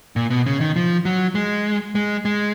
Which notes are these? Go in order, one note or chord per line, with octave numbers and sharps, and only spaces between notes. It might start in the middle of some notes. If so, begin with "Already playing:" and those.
A#2
B2
C#3
D#3
F3
F#3
G#3
G#3
G#3